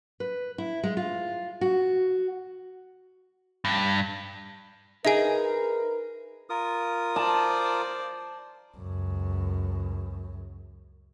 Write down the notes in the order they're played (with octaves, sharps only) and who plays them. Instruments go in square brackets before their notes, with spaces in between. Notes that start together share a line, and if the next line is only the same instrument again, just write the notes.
[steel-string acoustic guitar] B4
E4
G#3
F4
F#4
[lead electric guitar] G2
[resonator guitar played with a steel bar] D#4 G#4 [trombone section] A#4 B4 [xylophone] E5 G#5
[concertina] F4 A#4 D#6
[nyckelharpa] C5 D5 [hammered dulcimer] A5
[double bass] C#2 F#2